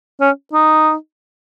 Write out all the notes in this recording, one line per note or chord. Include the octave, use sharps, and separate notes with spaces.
C#4
D#4